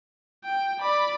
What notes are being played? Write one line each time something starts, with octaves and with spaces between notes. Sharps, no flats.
G5
D5 B5